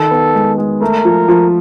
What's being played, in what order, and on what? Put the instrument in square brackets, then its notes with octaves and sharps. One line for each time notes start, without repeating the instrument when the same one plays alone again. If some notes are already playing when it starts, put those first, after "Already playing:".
Already playing: [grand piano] D#3 [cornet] A4
[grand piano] B3
G#3
G#3
[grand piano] A3 [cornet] A#4
[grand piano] F3
F3